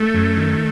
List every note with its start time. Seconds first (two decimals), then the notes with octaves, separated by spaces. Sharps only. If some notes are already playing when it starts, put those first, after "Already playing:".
Already playing: A3
0.14 F#2
0.37 D#3